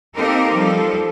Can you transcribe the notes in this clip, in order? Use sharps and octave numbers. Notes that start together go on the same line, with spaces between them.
A#3 C4 D#4 G4 A4 A#4
F3 G3 A4